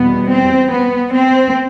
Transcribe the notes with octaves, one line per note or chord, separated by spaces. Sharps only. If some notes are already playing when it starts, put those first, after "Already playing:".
Already playing: E2 B2 G3 B3
C4
B3
C4